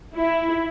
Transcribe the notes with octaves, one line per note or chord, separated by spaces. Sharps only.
E4